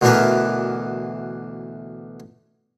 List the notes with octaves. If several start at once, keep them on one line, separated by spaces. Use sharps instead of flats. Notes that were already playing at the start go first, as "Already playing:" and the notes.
D2 B2 E3 D4 A#4 B4